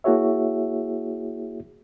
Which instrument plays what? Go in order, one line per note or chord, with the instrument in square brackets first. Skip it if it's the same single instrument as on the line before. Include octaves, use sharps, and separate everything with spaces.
[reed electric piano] A#3 E4 F#4 G#4 C#5 E5